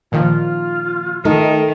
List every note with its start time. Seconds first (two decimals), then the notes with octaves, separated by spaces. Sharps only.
0.12 A#2 D#3 F3 F4
1.25 D#3 A3 D#4